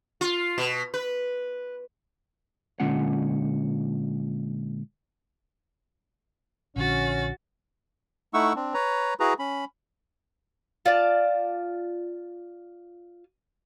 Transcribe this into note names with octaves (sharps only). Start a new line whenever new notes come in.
F4
B2
B4
A#2 D3 G#3 C#4 F4 F#5
A#1 D3 C#4 F#4 A6
A3 D#4 E4 F#5 C#6 E6
C4 D4
B4 C#5 A#5
E4 F#4 G#4 B4 A#5
C#4 B5
F4 D5 A5